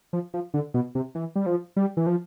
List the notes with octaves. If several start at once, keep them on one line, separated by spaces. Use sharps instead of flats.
F3
F3
D3
B2
C3
E3
G3
F3
G3
E3
F3